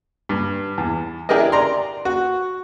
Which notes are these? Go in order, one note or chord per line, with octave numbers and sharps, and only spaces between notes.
G2
E2
D4 E4 G4 G#4 A#4 D#5
D5 A#5 C6
F#4